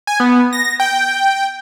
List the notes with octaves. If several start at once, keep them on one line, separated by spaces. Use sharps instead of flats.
G#5
B3
A#6
G5